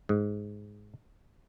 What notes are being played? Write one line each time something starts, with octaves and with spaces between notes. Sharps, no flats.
G#2